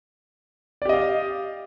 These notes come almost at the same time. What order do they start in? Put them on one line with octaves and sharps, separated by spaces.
D5 G4 D#5 F5